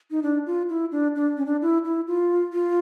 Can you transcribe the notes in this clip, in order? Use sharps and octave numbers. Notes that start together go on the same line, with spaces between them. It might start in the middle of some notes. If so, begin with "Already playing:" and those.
D#4
D4
F4
E4
D4
D4
C#4
D4
E4
E4
F4
F4